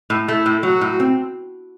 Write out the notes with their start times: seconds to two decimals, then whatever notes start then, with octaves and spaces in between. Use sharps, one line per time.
0.10 A2
0.28 A3 E4
0.46 A2
0.63 F#3 F#4
0.81 A2
1.00 C4